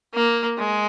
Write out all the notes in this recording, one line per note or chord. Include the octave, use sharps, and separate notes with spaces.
A#3
G#3